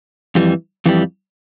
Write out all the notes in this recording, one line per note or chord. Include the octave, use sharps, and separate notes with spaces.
F2 E3 G3
F2 E3 G3